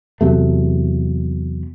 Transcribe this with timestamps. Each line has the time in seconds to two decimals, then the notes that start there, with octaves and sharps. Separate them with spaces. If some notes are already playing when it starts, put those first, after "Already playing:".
0.21 E2 C3 F#3 A3